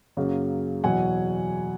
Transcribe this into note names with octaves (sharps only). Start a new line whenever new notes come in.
F#2 C#3 F#3 A#3
E2 B2 F#3 F#5 G#5